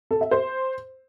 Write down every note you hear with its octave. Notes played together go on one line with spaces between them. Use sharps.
A4
E5
C5